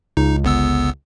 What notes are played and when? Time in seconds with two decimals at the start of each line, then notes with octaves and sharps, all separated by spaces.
0.17 C#2 D#4
0.44 G1 B3 E6